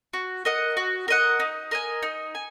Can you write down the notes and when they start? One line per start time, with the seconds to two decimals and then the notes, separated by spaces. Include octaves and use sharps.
0.13 F#4
0.45 A#4 D#5 F#5
0.77 F#4
1.08 A#4 D#5 F#5
1.40 D#4
1.71 A#4 D#5 G#5
2.02 D#4
2.35 G#5